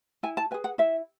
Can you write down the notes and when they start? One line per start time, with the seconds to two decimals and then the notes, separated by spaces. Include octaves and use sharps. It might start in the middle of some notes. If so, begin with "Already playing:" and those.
0.23 E4 G#5
0.37 A5
0.51 B4 G#5
0.54 G#4
0.64 F#5
0.78 E4 E5